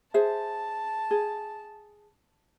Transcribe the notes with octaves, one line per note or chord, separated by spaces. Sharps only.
G#4 C5 E5 A5
G#4